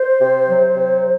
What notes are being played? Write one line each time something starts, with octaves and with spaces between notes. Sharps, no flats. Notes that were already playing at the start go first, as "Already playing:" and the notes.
Already playing: C5
C3
F#3
C3